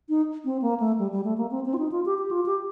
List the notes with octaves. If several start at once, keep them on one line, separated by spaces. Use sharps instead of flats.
D#4
C4
A#3
A3
G3
G3
A3
A#3
C4
C4
F4
D#4
F4
G4
G4
F4
G4